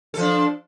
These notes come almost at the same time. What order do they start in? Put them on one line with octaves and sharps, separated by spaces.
A4 F3 D4